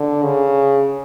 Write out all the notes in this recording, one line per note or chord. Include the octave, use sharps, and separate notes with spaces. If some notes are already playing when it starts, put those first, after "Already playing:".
Already playing: D3
C#3